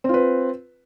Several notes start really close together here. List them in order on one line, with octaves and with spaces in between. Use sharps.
C4 F4 B4